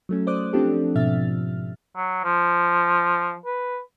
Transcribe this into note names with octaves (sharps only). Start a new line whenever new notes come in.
F#3 A3 C#4
C5 D5 D6 D#6 F#6
F3 C4 D4 F4 G4 A4
G#2 B2 F3 E5 F6 A6
F#3
F3
B4